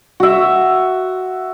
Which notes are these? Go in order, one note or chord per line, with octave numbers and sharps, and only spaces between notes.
F#4 E5